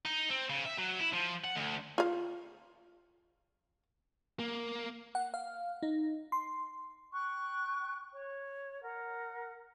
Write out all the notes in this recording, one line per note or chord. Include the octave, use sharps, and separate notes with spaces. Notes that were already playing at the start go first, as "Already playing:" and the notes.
D#4
C4
C#3
E5
F#3
E4
F3
F#5
D2
F4 F5
A#3
F#5
F5
D#4
C6
G5 C#6 F#6
C#5
A#4 F#5